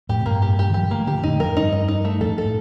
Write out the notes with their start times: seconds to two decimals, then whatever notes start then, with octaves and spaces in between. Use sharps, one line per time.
0.09 F2 A2 G4
0.20 C3
0.26 G2 A#2 A#3
0.42 G4
0.59 G4
0.70 D#3
0.74 F3 G4
0.83 G3
0.91 F3 A3 A#3
1.07 D3 F3 G4
1.23 F2 A2 D#4
1.35 G2
1.39 F2 A#4
1.56 G2 D#4
1.72 D#5
1.88 D#4
2.05 A3
2.21 F2 A2 A4
2.29 G2
2.38 A4
2.45 A2